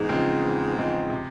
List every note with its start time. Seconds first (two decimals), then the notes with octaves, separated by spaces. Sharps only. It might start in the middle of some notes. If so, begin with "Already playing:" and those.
Already playing: E2 G#2
0.09 C#3 F3 G#3 C4
0.42 E2
0.76 C#3 F3 G#3 C4
1.10 C3